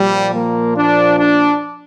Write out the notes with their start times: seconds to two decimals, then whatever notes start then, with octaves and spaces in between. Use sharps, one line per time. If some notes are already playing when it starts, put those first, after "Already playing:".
Already playing: A#2 F3 G3
0.34 A#3
0.77 D4
1.19 D4